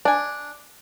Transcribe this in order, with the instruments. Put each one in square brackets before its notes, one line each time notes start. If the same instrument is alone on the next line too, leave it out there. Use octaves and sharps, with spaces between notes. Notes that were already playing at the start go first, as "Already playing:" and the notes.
[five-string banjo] D4 G#5